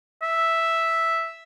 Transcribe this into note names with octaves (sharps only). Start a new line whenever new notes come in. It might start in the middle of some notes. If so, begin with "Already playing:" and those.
E5